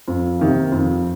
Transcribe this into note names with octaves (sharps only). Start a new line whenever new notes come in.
F2
C3 D#3 A#3
F2